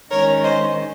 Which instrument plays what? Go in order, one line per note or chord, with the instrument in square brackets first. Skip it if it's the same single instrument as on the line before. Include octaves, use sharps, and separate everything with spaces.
[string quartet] D#3 G#3 C#4 A#4 C#5
C5 D#5